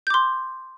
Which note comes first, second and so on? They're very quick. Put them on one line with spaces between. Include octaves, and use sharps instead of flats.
G6 D6 C6